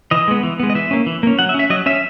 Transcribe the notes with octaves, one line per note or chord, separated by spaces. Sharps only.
E3 D#5
G#3 B3
E3
G#3 B3
D#5
E3 E5
A#3 C#4
E3
A#3 C#4
F#3 F#5
E5
C#4
E5
F#3 D#5
C#4 E5